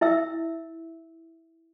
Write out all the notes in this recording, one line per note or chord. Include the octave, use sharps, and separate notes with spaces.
E4 E5 E6